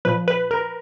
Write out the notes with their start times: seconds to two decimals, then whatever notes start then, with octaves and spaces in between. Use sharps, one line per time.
0.05 A#2 F3 B4
0.28 B4
0.51 A#4